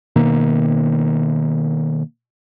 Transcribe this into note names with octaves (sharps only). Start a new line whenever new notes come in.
B2 D#3 A#3